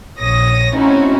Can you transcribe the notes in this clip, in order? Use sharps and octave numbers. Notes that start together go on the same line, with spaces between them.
A#1 C#5 D#6 A#6
A2 C4 C#4 D#4 E4 F#4